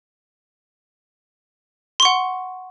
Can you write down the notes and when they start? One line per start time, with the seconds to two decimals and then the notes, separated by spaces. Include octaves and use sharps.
2.00 C6
2.03 C#6
2.05 F#5